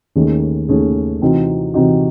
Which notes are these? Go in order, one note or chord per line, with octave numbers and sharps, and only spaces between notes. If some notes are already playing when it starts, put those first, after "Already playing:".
D#2 D#3 A3 C#4 G#4
D#2 D#3 A3 C#4 G#4
C3 E3 C4 D#4 F#4
C3 E3 C4 D#4 F#4